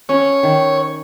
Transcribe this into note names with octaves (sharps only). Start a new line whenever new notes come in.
C#4 C#5
D#3